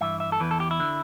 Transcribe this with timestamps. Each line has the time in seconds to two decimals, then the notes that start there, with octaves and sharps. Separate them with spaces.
0.01 G2 E3 E5
0.20 E5
0.32 A4
0.40 E2 E3 B4
0.51 A4
0.60 G4
0.71 E4
0.80 D3